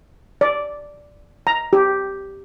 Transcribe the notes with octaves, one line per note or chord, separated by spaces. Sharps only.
D5
A#5
G4